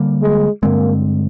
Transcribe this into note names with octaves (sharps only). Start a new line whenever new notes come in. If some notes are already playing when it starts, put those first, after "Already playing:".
Already playing: D3 G3 A#3
G#3
G2 D3 G#3 A#3 C4